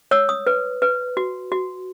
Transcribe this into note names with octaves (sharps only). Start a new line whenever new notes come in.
C#5 E6
D#6
B4
B4
F#4
F#4